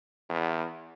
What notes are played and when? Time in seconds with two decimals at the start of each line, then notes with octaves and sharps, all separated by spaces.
0.29 E2